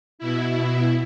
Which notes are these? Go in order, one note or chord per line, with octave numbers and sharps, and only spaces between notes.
B2 E4